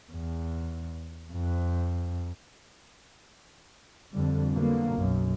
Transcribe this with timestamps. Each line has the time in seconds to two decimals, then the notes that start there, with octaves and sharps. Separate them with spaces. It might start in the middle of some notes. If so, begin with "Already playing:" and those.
0.11 E2
1.32 F2
4.12 F2 D3 G3
4.51 B2 D3 F#3 A#3
4.94 B1 F#2